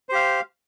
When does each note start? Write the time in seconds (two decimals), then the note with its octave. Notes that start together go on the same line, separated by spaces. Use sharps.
0.09 C5
0.12 G4
0.15 F5